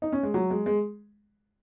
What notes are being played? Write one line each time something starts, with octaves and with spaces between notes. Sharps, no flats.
D#4
C#4
G#3
F#3
G#3
G#3